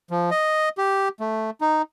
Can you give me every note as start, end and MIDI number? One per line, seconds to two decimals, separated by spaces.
0.10 0.30 53
0.31 0.69 75
0.78 1.09 67
1.20 1.50 57
1.61 1.82 63